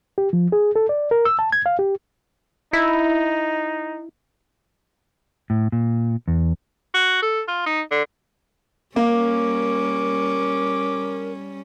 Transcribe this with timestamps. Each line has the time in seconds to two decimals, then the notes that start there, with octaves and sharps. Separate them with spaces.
0.18 G4
0.33 F3
0.52 G#4
0.76 A4
0.89 D5
1.11 A#4
1.25 E6
1.39 A5
1.52 G#6
1.66 F5
1.79 G4
2.73 D#4 E4
5.50 A2
5.72 A#2
6.28 E2
6.94 F#4
7.22 A4
7.48 F4
7.66 D#4
7.91 D3
8.96 G3 A#3 C#4 A#4 D6